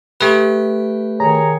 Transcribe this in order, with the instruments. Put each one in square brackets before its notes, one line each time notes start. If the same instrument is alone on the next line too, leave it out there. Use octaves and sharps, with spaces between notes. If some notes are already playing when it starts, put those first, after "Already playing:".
[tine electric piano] A3 B4 [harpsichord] G4
[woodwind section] D#3 G#4 C#5 [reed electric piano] A#5